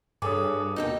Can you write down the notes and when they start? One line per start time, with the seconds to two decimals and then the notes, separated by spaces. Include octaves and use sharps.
0.22 G2 G#4 A4 B4 C#5 D6 D#6
0.76 D#2 B2 D#3 D#4 A4 G5